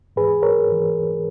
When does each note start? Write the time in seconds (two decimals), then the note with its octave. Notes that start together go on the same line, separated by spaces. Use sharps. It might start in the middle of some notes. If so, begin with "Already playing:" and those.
0.16 G#2 E3 G#4 B4
0.43 A#4 C#5
0.69 G#2 E3